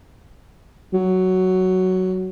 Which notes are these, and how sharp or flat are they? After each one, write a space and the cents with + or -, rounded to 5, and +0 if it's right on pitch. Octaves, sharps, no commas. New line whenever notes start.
F#3 +5